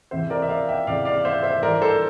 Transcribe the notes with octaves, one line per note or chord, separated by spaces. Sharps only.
E2 C3 E3 C5 E5
A#4 D5
E5
D5 F5
E5 G5
E2 C3 E3 D5 F5
D5 F5
C5 E5
C5 E5
G2 E3 A#4 D5
A4 C5